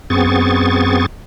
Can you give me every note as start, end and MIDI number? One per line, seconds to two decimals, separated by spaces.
0.10 1.06 42
0.10 1.06 59
0.10 1.06 60
0.10 1.06 68
0.10 1.06 85
0.10 1.06 93